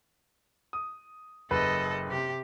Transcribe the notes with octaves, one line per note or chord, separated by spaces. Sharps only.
D#6
F#1 A4 B4 D#5
C3 G4